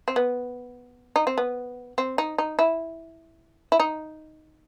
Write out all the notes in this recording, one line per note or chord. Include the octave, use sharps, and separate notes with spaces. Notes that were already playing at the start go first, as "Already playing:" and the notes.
C4
B3
D#4
C4
B3
C4
D#4
D#4
E4
E4
D#4